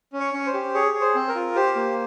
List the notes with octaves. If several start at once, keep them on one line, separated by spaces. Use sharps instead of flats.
C#4
C#5
C#4
C5
G4
G#4 C#5
G#4
C5
C4
A#4
F4
G4 C5
A#3